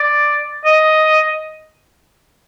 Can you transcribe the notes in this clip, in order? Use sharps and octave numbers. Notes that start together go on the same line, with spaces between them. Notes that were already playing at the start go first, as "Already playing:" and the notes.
Already playing: D5
D#5